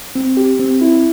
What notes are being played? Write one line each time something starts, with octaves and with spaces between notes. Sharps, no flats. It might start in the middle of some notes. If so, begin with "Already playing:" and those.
C4
G4
C4
E4